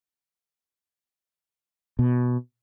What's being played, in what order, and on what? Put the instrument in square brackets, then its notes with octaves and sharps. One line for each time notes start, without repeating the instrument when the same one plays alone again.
[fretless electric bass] B2